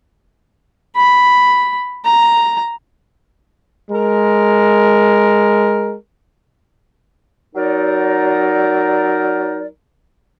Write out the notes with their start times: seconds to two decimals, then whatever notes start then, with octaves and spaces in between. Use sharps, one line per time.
0.96 B5
2.05 A#5
3.91 G#3 A#4
7.55 F#3 D#4 A#4 D5